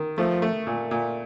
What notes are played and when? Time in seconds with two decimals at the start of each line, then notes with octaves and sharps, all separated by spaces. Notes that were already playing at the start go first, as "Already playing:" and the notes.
Already playing: D#3
0.18 F3 A3
0.42 A3
0.67 A#2
0.91 A#2